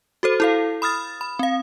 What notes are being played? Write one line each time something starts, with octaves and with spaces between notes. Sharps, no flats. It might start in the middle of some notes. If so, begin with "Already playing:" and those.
F#4 A4 C5
E4 A4 F5
B5 D#6 F6 A6
B5
C4 F5